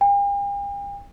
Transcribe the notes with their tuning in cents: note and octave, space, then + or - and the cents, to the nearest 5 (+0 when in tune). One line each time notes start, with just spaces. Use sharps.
G5 +45